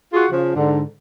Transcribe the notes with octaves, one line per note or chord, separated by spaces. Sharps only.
F4 F#4 G#4
C#3 F3
G#2 D3